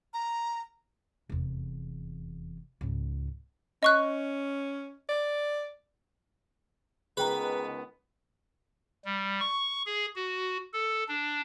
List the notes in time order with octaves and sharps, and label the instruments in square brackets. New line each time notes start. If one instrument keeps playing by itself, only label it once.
[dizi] A#5
[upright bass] F1 E2
C#2 G#2
[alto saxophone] C#4 [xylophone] D#5 C#6 F#6
[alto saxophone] D5
[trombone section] C#2 D#3 B3 [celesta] G#4 G5 A#5 [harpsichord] B4
[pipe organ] G3
C#6
G#4
F#4
A4
D4